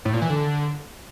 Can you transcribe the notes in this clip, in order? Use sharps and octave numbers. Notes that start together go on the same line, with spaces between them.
A2
A#2
E3
D3